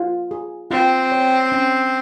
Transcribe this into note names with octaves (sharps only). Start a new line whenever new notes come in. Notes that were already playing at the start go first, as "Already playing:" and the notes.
Already playing: F4
G#4
C4 F4
C#5
C#4